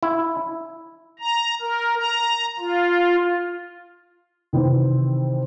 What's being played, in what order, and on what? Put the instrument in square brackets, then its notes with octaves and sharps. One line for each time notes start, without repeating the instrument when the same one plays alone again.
[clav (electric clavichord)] E4
[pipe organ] A#5
A#4
A#5
F4
[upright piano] C3 D#3 E3 C4 E4